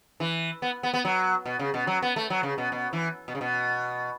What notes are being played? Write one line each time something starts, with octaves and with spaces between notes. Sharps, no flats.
E3
B3
B3
B3
F#3
B2
C#3
B2
F#3
B3
A3
F#3
C#3
B2
B2
E3
B2
C#3
B2